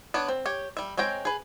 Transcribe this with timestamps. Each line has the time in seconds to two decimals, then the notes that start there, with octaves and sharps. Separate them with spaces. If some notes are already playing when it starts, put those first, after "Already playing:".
0.14 B3 D4 C#5
0.28 C4
0.46 G4 C#5
0.77 G3 E5
0.97 G#3 C4 C#5 G5 A#5
1.25 G#4 B4